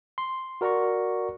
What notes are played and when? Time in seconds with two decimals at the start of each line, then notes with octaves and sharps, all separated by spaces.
0.18 C6
0.61 F#4 A#4 D5 F#5 A#5 C#6